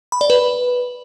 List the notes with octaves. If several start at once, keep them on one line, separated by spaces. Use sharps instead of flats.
B5
D5
B4